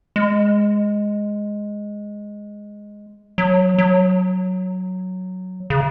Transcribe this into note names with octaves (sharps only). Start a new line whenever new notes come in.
G#3
F#3
F#3
C#3